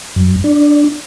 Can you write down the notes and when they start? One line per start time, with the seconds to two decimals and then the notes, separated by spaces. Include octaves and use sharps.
0.16 F#2
0.44 D4